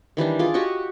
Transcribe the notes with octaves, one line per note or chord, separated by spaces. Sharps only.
D#3 E3 G3 D4
F4 G#4 D5
F#4 G4 D#5 C#6